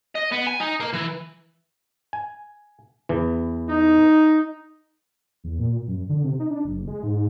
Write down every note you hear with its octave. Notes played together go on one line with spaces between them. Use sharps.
D#5
B3
G#5
D#4
A#3 A#4
E3
G#5
E2 E3
D#4
E2
A#2
F#2
D3
C3
D#4
D4
F#1
G#3
G#2